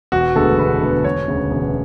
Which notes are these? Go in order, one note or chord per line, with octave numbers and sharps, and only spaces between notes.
E1 F#4
D2 D3 G#3 B3 A4
E1 B4
D2 D3 G#3 B3
E1 C#5
D2 C#3
E1